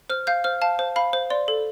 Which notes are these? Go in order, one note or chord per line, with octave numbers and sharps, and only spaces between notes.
C5 F6
F5 G6
C5 F6
F5 A5
C5
F5 B5
C5
D5 C6
A4